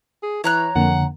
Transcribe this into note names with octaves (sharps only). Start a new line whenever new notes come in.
G#4
E3 C#5 A#5 F#6
F2 D3 A#3 F#5